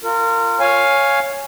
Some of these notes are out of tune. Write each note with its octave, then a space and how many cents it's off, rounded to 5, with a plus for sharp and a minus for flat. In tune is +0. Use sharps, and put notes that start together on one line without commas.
F4 +0 A#4 -30
C#5 +0 F5 +5 G#5 +0